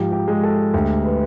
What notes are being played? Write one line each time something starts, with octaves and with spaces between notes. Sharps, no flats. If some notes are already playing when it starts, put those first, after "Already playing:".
Already playing: G#2 F3 G4
G4
G#3
A4
D2 G4
B4